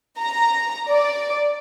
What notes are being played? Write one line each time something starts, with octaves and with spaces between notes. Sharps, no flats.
A#5
D5